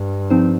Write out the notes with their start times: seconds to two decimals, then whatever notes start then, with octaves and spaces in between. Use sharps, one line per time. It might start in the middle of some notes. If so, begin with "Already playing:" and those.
Already playing: G2
0.30 F3 C4 D#4 C5